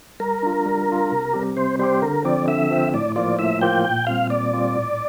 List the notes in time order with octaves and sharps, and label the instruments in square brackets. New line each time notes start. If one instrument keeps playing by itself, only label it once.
[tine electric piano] G3 [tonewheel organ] A#4
[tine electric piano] D4 F4
G3
D4 F4
C3
G3 C4 G4
[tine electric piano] C3 [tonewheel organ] C5
[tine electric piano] G3 C4 G4 [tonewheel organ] C5
[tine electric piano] D3 [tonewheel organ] A#4
[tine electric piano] F3 C4 [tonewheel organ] D5
[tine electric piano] D3 [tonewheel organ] E5
[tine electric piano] F3 C4
[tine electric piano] A2 [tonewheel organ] D5
[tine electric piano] F3 A#3 F4 [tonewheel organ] D5
[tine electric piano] A2 [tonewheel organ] E5
[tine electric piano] F3 A#3 F4 [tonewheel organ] G5
[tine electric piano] A#2 [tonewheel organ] G5
[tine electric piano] G3 C4 F4 [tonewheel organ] F5
[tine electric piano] A#2 [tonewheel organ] D5
[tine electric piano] G3 C4 F4
A2